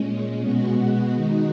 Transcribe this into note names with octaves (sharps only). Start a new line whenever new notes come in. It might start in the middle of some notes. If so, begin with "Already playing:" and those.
Already playing: A#2 G#3 C#4
B2 G#3 B3 F#4
D#3 G#3 D#4 F#4